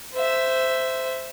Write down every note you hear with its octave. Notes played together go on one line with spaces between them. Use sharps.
C5 E5